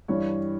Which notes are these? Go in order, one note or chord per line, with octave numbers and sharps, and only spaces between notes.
G2 E3 G3 C#5